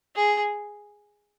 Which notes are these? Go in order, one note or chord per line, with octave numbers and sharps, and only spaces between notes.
G#4